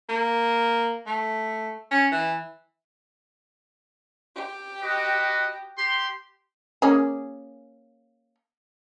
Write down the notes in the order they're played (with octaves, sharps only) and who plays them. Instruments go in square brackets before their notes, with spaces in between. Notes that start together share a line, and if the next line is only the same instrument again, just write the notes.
[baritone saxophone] A#3
A3
C#4
E3
[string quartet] G4
[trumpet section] F#4 B4 D#5
G4 C6
[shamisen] A#3 C#4 G#4